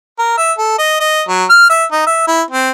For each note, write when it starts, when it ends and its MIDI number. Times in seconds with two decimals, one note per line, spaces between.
0.19 0.34 70
0.38 0.52 76
0.58 0.77 69
0.78 0.97 75
1.00 1.22 75
1.28 1.44 54
1.50 1.66 89
1.69 1.84 76
1.92 2.02 63
2.06 2.25 76
2.28 2.42 64
2.51 2.71 60